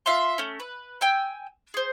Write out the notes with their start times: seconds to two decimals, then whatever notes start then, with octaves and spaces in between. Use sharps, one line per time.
0.06 F4 E5 F5 C6
0.38 A3 C#4
0.60 B4
1.01 G5 G#5 E6
1.74 G#4 C5